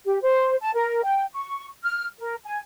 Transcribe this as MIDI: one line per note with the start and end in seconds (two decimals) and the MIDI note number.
0.05 0.19 67
0.22 0.56 72
0.61 0.71 81
0.75 1.02 70
1.03 1.25 79
1.33 1.66 85
1.83 2.06 89
2.19 2.35 70
2.44 2.58 80